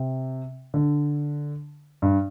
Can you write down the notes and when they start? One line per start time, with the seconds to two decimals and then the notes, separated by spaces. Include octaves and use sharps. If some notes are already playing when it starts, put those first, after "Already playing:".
Already playing: C3
0.74 D3
2.02 G2